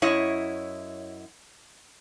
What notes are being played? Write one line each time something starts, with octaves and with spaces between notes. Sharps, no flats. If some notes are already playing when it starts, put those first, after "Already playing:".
F#2 E4 C#5 D#5